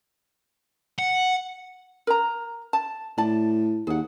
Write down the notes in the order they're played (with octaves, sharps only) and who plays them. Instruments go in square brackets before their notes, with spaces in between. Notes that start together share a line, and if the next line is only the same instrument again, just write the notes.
[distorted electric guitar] F#5
[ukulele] A#4 A#5
A5
[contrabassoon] A2 [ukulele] D5 A5
[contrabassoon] D#2 [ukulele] G#4 F#5